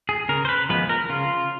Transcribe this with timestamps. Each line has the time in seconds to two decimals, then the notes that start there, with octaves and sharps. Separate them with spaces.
0.09 G#4
0.29 C#3 A#4
0.45 C5
0.49 B4
0.69 F3 G#3 B3 B4
0.89 A#4
1.09 C#3 F4